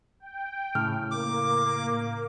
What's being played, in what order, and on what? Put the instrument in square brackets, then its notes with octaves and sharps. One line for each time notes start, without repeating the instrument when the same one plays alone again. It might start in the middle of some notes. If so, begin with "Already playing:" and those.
[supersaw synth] G5
[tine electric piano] A2 C#3 [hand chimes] F6
[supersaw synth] A#3 [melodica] D6